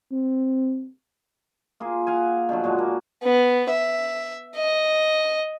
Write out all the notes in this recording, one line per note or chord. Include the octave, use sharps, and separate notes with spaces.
C4
A#3 F4 G#4
F5 F#5 G#5
B2 D3 F3 F#3
A#2 G#3 F#4
A#3
B3
E5
D#5